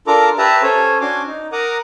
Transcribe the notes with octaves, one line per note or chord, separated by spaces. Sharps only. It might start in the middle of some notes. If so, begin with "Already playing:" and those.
D4 F4 A4 A#4 A#5 D6
G4 B4 E5 A5 A#5
C#4 A4 C5 C#5 G#5
C#4 D4 F#4 G#5 C6 D6
D#4
A#4 F#5 A#5 D6 D#6